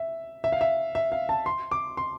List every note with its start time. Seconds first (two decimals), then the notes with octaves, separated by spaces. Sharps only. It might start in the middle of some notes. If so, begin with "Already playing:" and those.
Already playing: E5
0.44 E5
0.52 F5
0.61 E5
0.95 E5
1.12 F5
1.29 A5
1.46 C6
1.71 D6
1.97 C6